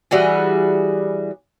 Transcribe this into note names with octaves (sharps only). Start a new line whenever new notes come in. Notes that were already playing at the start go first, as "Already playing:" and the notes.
E3 G3 F#4 G#4